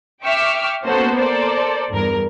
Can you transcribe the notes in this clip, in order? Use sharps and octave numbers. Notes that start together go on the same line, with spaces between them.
E5 G5 C#6 D6 E6 F6
A#3 B3 C#4 F#4 A4 C5
A4 A#4 C5 D5
E2 G2 A#4